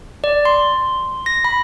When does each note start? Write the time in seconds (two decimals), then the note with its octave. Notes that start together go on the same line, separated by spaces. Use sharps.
0.24 D5
0.45 C6
1.26 A#6
1.45 B5